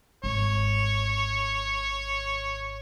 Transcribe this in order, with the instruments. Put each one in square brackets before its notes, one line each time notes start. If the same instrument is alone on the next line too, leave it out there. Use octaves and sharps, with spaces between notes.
[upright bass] G#1 [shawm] C#5